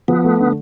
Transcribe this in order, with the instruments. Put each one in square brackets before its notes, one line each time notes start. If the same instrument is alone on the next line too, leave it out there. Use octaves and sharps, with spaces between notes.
[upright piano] F3 [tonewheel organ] B3
[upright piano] A3
D3